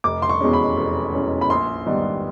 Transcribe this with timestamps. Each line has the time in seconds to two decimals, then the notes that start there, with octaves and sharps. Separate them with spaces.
0.04 F1 D6
0.22 C6
0.29 C#6
0.41 E2 B2 G#3 C#4
0.53 B5
0.77 F1
1.14 E2 B2 G#3 C#4
1.41 B5
1.50 A#1 C6
1.86 G#2 D#3 G3 B3